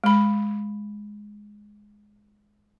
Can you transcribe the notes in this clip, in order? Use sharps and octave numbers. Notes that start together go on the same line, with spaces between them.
G#3 B5